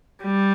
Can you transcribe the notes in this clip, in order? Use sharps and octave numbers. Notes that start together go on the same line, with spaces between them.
G3